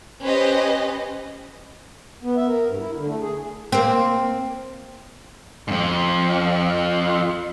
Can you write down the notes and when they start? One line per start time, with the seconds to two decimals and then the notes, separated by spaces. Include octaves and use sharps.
0.23 C#4 G4 B4 C5 D#5
2.23 B3
2.37 E5
2.48 A#4
2.67 G2
2.80 E4
2.95 D3
3.07 A3
3.21 G#4
3.72 A#3 C4
5.68 F2 G#2